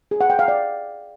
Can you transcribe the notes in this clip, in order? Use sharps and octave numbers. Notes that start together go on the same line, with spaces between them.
G#4
F#5
G5
F5
D5